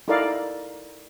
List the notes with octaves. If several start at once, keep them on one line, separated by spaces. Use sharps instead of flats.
D#4 E4 A4 A#4 D5 F5